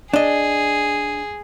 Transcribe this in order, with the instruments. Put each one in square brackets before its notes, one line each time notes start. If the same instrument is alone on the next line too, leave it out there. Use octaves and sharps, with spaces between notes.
[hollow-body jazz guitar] D4 D#5 [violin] G#4